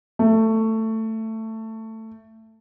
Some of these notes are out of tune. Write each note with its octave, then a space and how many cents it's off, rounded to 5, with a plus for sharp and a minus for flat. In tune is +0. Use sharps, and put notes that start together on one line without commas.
A3 +15